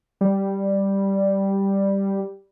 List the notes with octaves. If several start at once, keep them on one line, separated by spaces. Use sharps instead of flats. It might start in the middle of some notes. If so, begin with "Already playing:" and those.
G3